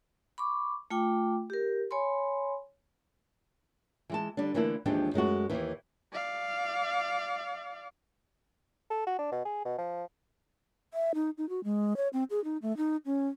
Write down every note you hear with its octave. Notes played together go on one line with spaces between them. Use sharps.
B5 C#6 D6
A3 F4 G5 D6
G4 A#4
C#5 G#5 B5 C6
E3 G#3 A5
D3 G3 D4
D3 E3 A3 A#3 D4 E4
D#2 E3 F3 G#3 D4 G4
F#2 G#3 A3 F#4
D#2 E3
D5 F5
A4
F#4
D4
B2
G#4
B2
F3
E5
D#4
D#4
F#4
G#3
C#5
C4
G#4
D#4
A3
D#4
C#4